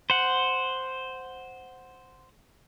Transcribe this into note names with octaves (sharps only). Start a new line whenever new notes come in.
C5 F#5